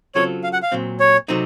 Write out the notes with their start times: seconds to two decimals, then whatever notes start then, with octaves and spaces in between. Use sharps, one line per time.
0.15 C#3 F#3 C4 F4 A4 C#5
0.44 F5
0.53 F#5
0.63 F5
0.72 A#2 F#3 C4
1.00 C#5
1.28 C3 F#3 A3 C4 D#4